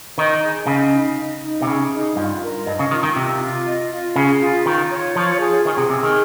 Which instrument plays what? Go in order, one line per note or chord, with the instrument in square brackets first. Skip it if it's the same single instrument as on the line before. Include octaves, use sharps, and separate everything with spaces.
[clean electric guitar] D#3 [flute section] D#4
[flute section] G#4
[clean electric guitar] C#3 [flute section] D#5
[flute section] D#4
D#5
D#4
[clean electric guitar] C3
[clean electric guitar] C#3 [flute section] G#4
[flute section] D#4
[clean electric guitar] G2 [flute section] F4
[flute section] A#4
[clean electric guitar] G2 [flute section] D#5
[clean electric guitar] C#3
[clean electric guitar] D#3 [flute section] F4
[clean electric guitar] D#3
[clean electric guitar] C3 [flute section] F4
[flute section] F4
D#5
F4
[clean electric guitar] C#3 [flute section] G#4
[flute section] F4
[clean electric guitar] D#3 [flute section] F4
[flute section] C#5
[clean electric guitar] F3 [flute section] F4
[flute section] G#4
[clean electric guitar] D#3 [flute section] G#4
[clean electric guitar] C3
[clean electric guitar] C3 [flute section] G#4
[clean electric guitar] D#3